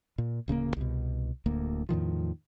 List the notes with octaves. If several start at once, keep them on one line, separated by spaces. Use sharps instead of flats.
A#2
D1 C#3 A3 A#3
C2 B2
D1 D2 A#3
E2 A2 D#3 F3